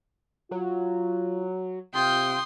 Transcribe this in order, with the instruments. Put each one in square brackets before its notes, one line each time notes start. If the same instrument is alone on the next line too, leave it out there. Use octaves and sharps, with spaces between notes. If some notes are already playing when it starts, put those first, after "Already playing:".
[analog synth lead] F#3 [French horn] F4
[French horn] C3 [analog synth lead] F4 [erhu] G5 [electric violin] C6 D#6